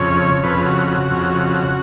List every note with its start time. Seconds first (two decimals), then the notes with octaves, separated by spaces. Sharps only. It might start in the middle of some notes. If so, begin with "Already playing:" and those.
Already playing: F2 C#3 C#5
0.43 F2 C#3 B4
0.66 F#4
0.88 F#4
1.11 F2 C#3